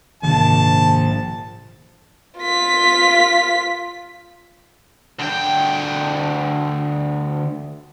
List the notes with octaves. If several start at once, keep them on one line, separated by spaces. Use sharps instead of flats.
A#1 G#2 C3 D#3 A5
F4 B6
D2 G5